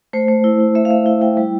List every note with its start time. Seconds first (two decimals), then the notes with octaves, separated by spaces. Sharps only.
0.13 A3 C5
0.28 A3
0.44 E4
0.60 E4
0.75 A3 E5
0.85 F5
0.90 A3 E5
1.06 E4 F5
1.21 E4 G5
1.37 G3